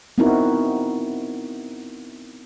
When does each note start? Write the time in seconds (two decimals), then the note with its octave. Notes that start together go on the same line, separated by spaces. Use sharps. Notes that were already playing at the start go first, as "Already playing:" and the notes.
0.18 B3 C4 D#4 E4 F#4 A#4